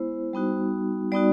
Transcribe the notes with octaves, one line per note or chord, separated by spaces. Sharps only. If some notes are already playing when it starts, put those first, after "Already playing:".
Already playing: G#3 B3 E4 C5
G3 B3 D#4 F#4
G3 B3 D#4 F#4 D5